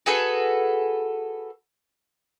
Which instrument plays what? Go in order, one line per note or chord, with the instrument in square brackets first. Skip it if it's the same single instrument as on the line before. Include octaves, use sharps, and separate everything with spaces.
[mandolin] F#4 G#4 A4 B4